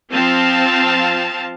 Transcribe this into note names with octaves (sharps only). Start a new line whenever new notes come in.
F3 C4 F5 A5